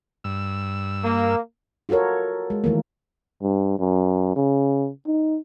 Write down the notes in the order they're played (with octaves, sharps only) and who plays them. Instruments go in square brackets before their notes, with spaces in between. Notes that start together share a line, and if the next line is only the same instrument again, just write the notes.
[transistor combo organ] G2 E6
[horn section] A#3
[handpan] F4 F#4 A4 A#4 C#5
G#3
D#3 E3 A3 A#3
[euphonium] G2
F#2
C#3
D#4